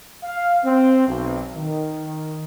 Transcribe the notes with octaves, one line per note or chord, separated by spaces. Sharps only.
F5
C4
B1
D#3